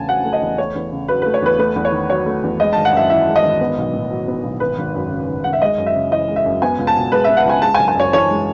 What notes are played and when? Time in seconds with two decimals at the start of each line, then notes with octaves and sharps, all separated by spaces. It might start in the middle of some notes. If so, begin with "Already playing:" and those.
Already playing: E2 C#3 A3 G#5 A5
0.08 F#3 F#5
0.25 A3
0.33 D#5
0.42 E2
0.58 A3 C#5
0.75 E2
0.92 C#3
1.08 F#3 B4
1.22 A3 B4
1.34 C#5
1.42 E2 B4
1.58 A3 B4
1.76 E2
1.85 C#5
1.92 D#3
2.10 F#3 C#5
2.26 A3
2.43 E2
2.60 G#3 D#5
2.73 G#1 A5
2.85 F#5
2.93 F#2 E5
3.10 E3 E5
3.27 G#3
3.36 D#5
3.43 G#1
3.61 B3
3.78 B1
3.93 A2
4.11 F#3
4.28 B3
4.44 B1
4.60 G#1 B4
4.78 G#1
4.94 F#2
5.11 C#3
5.28 G#1
5.44 G#1 F#5
5.53 E5
5.62 G#3 D#5
5.78 F#2
5.86 E5
5.95 C#3
6.11 E3 D#5
6.28 G#3
6.36 E5
6.46 F#2
6.62 B3 G#5
6.78 C#2
6.87 A5
6.96 B2
7.12 G#3 B4
7.24 B3 E5
7.37 F#5
7.45 C#2 G#5
7.62 G#3 A5
7.74 G#5
7.79 F#1
7.88 G#5
7.95 F#2 C#5
8.12 E3 C#5
8.30 G#3